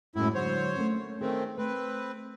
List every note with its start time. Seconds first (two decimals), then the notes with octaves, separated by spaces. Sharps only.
0.16 F#2 A2 G#3 E4
0.35 D3 F#3 G#3 C5 C#5
0.75 A3 A#3 C#4
1.21 D#3 A3 C4 G#4
1.58 A3 C4 B4